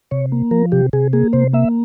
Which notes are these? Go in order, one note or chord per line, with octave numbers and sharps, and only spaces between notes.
C3 C#5
A#3
F3 A#4
C3 G4
C3 G#4
A#3 G#4
C3 C5
A#3 E5